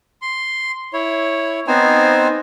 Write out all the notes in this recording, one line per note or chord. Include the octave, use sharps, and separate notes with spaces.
C6
E4 C#5
B3 C4 D#4 C5 G#5